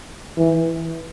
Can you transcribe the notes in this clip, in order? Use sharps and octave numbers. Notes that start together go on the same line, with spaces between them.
E3